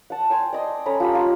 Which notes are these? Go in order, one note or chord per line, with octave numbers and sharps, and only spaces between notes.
F#5 A5
G5 G#5 C6
D5 D#5 C6
C#4 A4 A#5 B5
F4 G4 B5
F4 A#5 C6